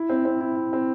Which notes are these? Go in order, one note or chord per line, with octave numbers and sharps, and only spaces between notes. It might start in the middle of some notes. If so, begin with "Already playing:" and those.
Already playing: E4
C4
C4
E4
E4
C4